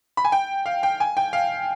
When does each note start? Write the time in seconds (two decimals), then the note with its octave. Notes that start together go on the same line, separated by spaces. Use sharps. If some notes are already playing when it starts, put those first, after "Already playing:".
0.17 B5
0.25 G#5
0.32 G5
0.66 F5
0.83 G5
1.00 G#5
1.17 G5
1.33 F5